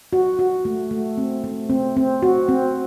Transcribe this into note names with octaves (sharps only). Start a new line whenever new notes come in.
F#4
F#4
A3
A3
C4
A3
C4
C4
F#4
C4